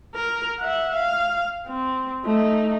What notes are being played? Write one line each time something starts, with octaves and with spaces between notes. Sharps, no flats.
A#4
E5 F#5
F5
C4
A3 D#4